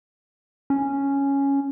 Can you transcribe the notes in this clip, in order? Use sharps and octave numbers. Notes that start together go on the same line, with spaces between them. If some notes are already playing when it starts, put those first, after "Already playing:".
C#4